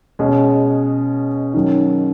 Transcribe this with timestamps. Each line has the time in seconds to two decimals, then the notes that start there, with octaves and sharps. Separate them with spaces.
0.19 B2 G#3 C#4 G#4
1.54 D#3 F#3 C#4